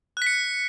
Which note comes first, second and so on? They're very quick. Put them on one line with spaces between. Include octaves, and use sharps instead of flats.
F#6 B6 C#7